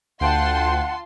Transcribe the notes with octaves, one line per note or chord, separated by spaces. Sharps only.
D2 F4 F#5 G5 A5 C6 F#6